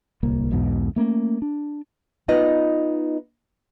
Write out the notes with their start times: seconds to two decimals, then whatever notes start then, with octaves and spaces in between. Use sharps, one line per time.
0.23 D1 C2 A#3
0.51 B1 E2 G#2 B2
0.96 A3 A#3 C#4
1.42 D4
2.28 B3 D#4 F4 B4 D#5